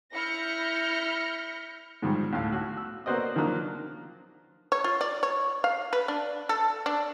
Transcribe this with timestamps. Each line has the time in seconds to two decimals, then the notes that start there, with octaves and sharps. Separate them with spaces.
0.12 E4 B5 F6 G6 A#6 C#7
2.02 G#2 D#3 F3 G3
2.33 D2 A2 F5
2.52 F#4
2.77 E6
3.06 A#3 B3 F#4 C5 D5 D#5
3.36 D#3 F3 F#3 A#3 D4
4.72 C#5
4.84 F4
5.01 D5
5.23 C#5
5.64 F5
5.93 B4
6.08 D4
6.49 A4
6.86 D4